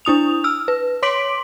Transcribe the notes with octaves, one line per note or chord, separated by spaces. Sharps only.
D4 E4 D#6 F7
E6 F6
B4
C#5 C6 D6 B6 D7 F#7